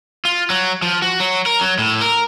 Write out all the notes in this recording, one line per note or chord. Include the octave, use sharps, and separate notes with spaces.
F4
F#3
F3
F#4
F#3
A#4
F#3
A2
A#4